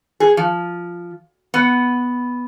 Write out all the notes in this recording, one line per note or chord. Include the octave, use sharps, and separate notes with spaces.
G#4
F3
B3